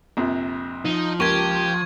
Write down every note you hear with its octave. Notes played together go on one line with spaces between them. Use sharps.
A#1 F2 C3
F3 D#4
C#2 A#3 G4 C#6 G#6